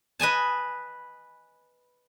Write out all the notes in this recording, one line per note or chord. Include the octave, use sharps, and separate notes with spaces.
B4 D#5 G#5 A5